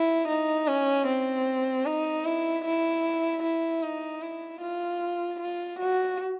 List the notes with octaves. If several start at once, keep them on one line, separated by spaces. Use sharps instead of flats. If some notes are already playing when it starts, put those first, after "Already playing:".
Already playing: E4
D#4
C#4
C4
D#4
E4
E4
E4
D#4
E4
F4
F4
F#4